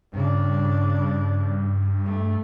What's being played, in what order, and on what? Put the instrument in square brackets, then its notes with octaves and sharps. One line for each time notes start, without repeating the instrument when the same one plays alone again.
[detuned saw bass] G2 [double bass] C#3 D4
[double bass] A3